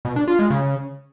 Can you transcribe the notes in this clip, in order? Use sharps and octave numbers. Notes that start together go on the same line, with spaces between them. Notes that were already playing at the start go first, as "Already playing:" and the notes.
B2
D4
F4
G#3
C#3